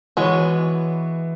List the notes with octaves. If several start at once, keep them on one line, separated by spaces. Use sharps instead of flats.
E3 G#3 B3 F#4 C#5